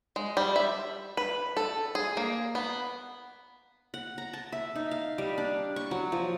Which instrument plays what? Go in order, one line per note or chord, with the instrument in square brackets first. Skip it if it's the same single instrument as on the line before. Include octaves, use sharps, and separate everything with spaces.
[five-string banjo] G#3
G3
E5
B4
A4
G#4
A#3
B3
[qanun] F#5
A#5
A5
E5
D#4
F5
G3
D4
C#6
F#3
F3